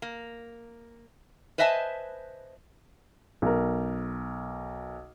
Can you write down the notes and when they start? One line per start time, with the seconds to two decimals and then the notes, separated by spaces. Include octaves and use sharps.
0.02 A#3
1.58 B4 C5 D#5 E5 G#5 A5
3.42 B1 A#4